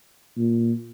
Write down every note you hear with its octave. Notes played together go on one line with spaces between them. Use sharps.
A#2